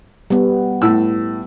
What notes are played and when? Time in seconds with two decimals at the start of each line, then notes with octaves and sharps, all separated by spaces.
0.30 G3 B3
0.82 A2 E6